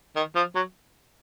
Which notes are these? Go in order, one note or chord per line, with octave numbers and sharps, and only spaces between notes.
D#3
F3
F#3